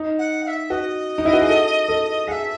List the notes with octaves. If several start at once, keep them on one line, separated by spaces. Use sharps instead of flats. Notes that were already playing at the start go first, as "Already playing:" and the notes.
Already playing: D#4
F#5
F#5
E5
F#4 D#5
D#4
E4
F#4
G#4
A4
A4
G#4 E5 F#5